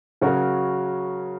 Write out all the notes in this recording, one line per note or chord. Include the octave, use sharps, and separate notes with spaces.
C#3 F#3 C#4 F#4 A#4